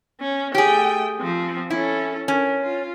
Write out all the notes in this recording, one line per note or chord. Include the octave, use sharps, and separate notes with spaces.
C#4
A3 G4 G#4 G5
F3 C4
C#4 E4 A4
C#4 A#4
F4